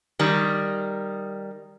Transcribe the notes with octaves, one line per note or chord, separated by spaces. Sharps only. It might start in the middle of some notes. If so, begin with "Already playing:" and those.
D#3 G3